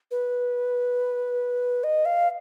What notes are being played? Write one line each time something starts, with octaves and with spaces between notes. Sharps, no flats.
B4
D#5
F5